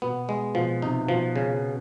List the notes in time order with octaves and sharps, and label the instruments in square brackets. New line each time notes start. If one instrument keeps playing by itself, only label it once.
[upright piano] B2 [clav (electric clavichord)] B3
[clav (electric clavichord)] G#3
[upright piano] B2 [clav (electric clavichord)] F3
[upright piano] C3 [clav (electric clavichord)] D#4
[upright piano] B2 [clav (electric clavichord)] F3
[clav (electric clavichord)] C#3